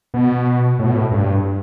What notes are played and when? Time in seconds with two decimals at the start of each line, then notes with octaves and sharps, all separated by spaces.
0.14 B2
0.79 A2
0.86 B2
0.93 A2
1.11 G2